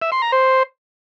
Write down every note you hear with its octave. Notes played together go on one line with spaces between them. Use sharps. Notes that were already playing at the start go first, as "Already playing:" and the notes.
E5
C6
A#5
C5